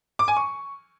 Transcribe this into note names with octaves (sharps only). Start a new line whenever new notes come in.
D6
G#5
C#6